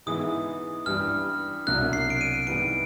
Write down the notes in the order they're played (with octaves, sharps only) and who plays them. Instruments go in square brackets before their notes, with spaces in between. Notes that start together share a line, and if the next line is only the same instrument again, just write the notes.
[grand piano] G#2 E3 G#3 B3 E4 [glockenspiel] D#6
[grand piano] G2 E3 G3 [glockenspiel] F6
[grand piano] C2 B2 F#3 A#3 D4 [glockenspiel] F#6
[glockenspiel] C7
D7
D#7
[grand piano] G#2 E3 G3 B3 [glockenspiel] D7